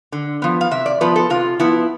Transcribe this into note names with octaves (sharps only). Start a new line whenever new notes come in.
D3
F3 B3
F5
C3 E5
D5
F3 B3 B4
A4
C3 F4
F3 B3 E4